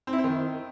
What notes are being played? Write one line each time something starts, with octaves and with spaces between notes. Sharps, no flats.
C4
E4
C4
D#3